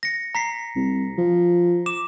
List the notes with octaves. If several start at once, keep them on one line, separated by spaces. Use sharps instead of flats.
A#6 C#7
A#5 B6 C7
C2
F3
D6 E7